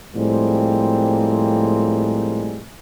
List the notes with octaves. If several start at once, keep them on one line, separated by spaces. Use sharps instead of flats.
A2 F3 G3 G#3 A#3 C4